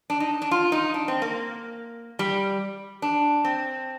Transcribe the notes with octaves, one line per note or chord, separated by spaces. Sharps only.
D4
D#4
D4
F4
D#4
D4
C4
A#3
G3
D4
C4